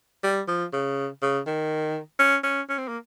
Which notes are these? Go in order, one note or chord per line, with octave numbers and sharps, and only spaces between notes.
G3
F3
C#3
C#3
D#3
C#4
C#4
C#4
C4
A#3